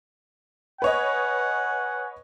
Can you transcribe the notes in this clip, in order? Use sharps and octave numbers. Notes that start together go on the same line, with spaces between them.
B4 C#5 D#5 F#5 G#5